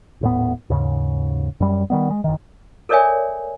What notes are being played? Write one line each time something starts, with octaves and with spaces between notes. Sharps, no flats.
D#1 A2 B3
D#2 G#2 C#3
F#2 G3
D#3 G3 B3
G#3
F#1 D#3
A4 A#4 C#5 D5 E5 G#5